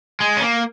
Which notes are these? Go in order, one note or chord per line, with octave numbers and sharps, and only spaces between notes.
G#3
C#4
A#3